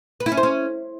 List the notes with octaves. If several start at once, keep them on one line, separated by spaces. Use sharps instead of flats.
B4
E4
C#4
C5
C#4